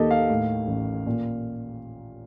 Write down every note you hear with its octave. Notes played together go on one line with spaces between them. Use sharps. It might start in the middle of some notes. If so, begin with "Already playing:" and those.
Already playing: D#2 D#3 G4 A4 D#5
F5
A2
A1
A#2